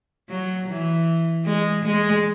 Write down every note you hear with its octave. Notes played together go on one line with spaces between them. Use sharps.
F#3
E3
G#3
G#3